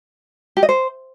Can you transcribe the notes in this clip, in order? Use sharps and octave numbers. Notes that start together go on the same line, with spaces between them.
G4
D#5
C5